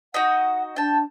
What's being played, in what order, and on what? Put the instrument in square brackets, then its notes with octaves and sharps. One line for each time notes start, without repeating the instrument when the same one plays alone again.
[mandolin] D#4 F#4 D#5 [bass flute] F#5
[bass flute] D4 [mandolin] G5 A5